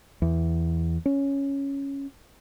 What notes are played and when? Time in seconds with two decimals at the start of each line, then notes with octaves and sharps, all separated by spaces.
0.22 E2
1.06 C#4